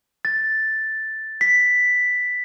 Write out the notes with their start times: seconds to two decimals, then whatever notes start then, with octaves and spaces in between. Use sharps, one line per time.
0.25 A6
1.41 B6